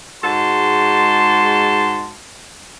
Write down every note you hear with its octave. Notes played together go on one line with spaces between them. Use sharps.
G#2 G#3 F#4 A5 C6